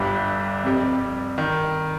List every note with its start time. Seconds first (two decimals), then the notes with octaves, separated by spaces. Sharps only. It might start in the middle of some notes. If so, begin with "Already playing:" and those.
Already playing: G1 G2 G3
0.63 F2 C3 G3
1.38 D#3